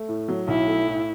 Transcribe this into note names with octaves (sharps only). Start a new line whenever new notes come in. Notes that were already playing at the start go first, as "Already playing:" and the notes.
Already playing: A3
A2
F#3
B1 E4
A3
A2